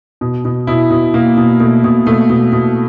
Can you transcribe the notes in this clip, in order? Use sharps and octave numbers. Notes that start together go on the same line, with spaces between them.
B2
B2
B2 E4
B2
B2 A#3
B2
B2 A3
B2
B2 A3
B2
B2